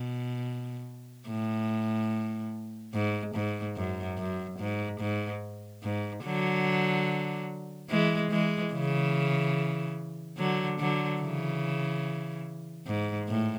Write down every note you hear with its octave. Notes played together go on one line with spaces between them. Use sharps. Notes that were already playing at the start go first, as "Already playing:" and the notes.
Already playing: B2
A2
G#2
G#2
F#2
F#2
G#2
G#2
G#2
D3 F#3
E3 G#3
E3 G#3
C#3 E3
D3 F#3
D3 F#3
C#3 E3
G#2
A2